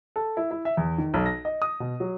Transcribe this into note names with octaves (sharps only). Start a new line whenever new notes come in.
A4
E4
E4
E5
E2
D#3
B1
A#6
D#5
D#6
B2
F#3